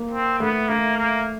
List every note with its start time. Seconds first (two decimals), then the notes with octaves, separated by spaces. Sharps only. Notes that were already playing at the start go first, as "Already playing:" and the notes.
Already playing: A#3
0.11 C4
0.40 A3 B3
0.69 A3 A#3
0.97 A#3